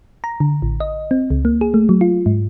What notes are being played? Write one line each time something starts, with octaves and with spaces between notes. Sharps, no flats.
A#5
D3
A1
D#5
C4
C#2
A#3
G#4
A3
F#3
F4
G#2